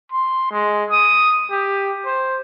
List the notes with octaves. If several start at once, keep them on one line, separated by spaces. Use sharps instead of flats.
C6
G#3
D#6
G4
C5